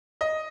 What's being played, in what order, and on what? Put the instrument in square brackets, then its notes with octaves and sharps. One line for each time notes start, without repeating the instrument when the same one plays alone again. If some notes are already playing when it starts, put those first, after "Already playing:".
[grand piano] D#5